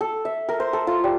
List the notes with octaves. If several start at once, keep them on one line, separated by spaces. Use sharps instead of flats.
A4
E5
A#4
C5
A4
F4
G3